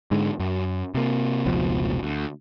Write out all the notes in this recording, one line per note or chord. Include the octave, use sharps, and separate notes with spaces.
G#2 D3 G#3
F#2
C3 A#3
F1 C#2 B2 F3
D2